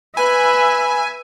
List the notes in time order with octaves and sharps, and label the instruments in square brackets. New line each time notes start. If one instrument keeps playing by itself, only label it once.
[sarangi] B4 [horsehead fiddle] E5 [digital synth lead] G#5 [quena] B5